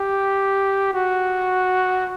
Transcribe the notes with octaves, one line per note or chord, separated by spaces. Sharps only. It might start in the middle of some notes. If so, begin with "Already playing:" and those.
Already playing: G4
F#4